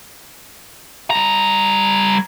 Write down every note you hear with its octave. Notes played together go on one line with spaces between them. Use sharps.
G3 A#5